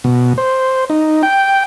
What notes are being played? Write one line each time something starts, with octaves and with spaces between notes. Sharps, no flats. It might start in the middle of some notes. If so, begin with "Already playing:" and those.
B2
C5
D#4
G5